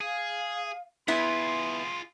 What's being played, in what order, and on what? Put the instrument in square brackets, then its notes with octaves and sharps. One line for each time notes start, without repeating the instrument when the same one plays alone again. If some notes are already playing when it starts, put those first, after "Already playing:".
[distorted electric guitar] G#4 [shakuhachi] F5
[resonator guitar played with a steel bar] B3 E4 [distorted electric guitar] F4 G#4 [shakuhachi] C6